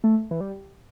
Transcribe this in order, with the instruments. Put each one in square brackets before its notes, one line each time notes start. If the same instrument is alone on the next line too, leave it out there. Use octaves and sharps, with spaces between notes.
[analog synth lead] A3
E3
G3